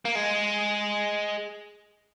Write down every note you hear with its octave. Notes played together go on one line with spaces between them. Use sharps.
A#3
G#3